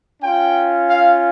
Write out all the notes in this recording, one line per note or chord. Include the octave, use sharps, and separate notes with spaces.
C#4 F4 G5
F5